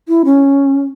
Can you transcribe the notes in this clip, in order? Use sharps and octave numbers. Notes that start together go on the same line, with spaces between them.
E4
C#4